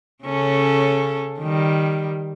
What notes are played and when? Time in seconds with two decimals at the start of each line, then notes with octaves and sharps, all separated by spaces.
0.24 C#3 C#4 A4
1.40 D#3 G3